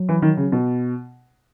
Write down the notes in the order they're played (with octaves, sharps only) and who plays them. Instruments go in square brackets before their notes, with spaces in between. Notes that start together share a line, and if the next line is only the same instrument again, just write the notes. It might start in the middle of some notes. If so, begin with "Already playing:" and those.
Already playing: [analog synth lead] F#3
[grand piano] E3
D#3
C#3
B2